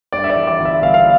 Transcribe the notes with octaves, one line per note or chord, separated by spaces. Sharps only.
G2 D5
E5
D5
E3
D5
G1
E5
G1 F5
F5